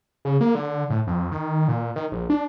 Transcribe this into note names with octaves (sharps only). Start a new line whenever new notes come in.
C#3
A#3
D3
A2
F2
D#3
A#2
D#3
A#1
D4